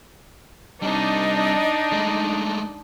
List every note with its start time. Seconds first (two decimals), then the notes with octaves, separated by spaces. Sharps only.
0.82 G3 C4 D4 D#4 D#5
1.92 G#3 A3